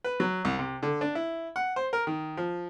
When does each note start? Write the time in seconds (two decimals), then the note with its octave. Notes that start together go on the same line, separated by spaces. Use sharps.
0.04 B4
0.20 F#3
0.45 C2
0.59 C3
0.83 D3
1.01 D4
1.15 E4
1.56 F#5
1.76 C5
1.93 A#4
2.07 D#3
2.37 F3